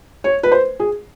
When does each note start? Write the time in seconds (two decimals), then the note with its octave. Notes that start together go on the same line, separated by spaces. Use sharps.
0.24 C#5
0.43 B4
0.52 C5
0.80 G#4